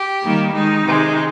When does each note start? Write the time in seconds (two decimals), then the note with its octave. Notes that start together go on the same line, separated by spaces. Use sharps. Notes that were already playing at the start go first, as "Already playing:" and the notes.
Already playing: G4
0.22 D#3 G3 A#3
0.54 D#3 G#3 D#4
0.86 C3 D#3 G#3